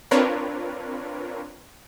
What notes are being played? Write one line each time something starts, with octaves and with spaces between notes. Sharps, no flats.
C4 D4 F4 A#4 B4 C#5